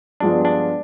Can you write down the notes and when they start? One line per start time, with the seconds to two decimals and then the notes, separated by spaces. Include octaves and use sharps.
0.20 G2 F3 G#3 B3 D4 F4
0.45 D4